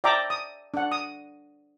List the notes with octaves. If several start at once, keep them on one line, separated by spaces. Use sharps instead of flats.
D5 E5 G5 A5 A#5 D6
D#6
D4 F#5
D#6